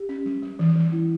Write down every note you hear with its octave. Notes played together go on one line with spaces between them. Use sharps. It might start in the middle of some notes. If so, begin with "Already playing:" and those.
Already playing: G4
C#4
G3
G3
E3
E3
E4